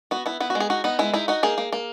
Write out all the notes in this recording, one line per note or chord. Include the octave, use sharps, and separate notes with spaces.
B3 F#4
B3 E4
B3 E4
F#4
G#3
G#4
D#4 F#4
B3 D#4
G#3 E4
D#4 E4
D#4 F#4
A#3 G#4
A#3
A#3